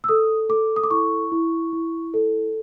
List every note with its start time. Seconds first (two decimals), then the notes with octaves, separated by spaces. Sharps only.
0.04 E6
0.08 A4 D#6
0.49 A4 D6
0.76 D#6
0.84 D6
0.90 E4 C#6
1.32 E4
1.73 E4
2.14 A4